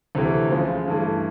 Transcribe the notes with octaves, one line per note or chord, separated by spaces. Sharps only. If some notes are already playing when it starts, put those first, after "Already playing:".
D2 C3 E3 A3
D2 C#3 F3 G#3
G2 E3 A3